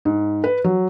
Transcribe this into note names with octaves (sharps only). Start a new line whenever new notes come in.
G#2
B4
F#3